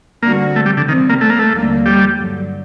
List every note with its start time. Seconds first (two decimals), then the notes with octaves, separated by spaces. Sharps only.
0.23 D3 G3 A#3 C4 F#4
0.56 A3
0.66 G3
0.77 D3
0.88 C3 D#3 G3 C4
1.09 A#3
1.21 A3
1.30 A#3
1.39 A3
1.53 D#2 D3 G3 A#3
1.86 G3
2.18 G2 D3 F#3